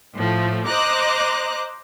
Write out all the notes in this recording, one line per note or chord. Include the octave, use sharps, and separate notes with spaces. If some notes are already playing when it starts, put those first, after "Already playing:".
A2 F3 A3
C5 D#5 A#5 D6 F#6